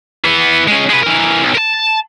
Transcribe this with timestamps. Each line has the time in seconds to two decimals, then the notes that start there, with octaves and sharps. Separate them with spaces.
0.24 E3 B3
0.68 G#3 C#4
0.90 G#3 B4
1.03 E3 A#4
1.42 B1
1.55 A#4 A5